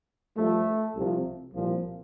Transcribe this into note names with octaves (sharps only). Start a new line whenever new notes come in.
G2 F3 A3
C2 C3 F3
C2 A#2 F3